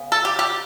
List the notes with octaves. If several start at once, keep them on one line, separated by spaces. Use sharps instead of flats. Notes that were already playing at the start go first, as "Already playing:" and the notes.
Already playing: C#3 B3
A4
G4
G4